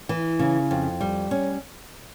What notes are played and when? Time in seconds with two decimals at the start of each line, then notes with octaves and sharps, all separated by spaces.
0.09 E3
0.39 C#3
0.71 F2
1.01 G3
1.31 C#4